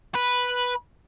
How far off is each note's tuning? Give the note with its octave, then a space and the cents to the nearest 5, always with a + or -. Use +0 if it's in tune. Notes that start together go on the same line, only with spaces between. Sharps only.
B4 -5